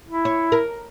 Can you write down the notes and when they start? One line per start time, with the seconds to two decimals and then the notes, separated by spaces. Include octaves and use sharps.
0.07 E4
0.25 C#5
0.52 A#4